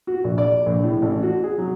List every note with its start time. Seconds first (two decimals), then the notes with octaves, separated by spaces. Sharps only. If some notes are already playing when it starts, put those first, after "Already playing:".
0.07 F#4
0.24 A#1
0.38 D5
0.66 A#1
0.83 A2
1.02 A1
1.23 F#4
1.44 G#4
1.58 F#3